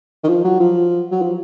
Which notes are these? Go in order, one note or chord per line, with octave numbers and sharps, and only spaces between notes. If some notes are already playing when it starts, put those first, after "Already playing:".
D#3
F3
F#3
F3
F#3
F3